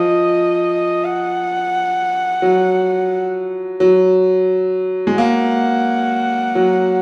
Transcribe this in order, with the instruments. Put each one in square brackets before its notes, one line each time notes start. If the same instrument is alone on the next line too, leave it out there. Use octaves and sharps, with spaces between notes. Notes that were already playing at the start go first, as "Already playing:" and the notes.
Already playing: [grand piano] F3 [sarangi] D#5
[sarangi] F#5
[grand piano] F#3
F#3
G#3
[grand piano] A#3 [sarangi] F#5
[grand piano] F#3